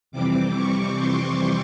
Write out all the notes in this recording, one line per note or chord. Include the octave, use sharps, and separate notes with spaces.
F2 C3 E3 G3 C4 D6
C#6
C6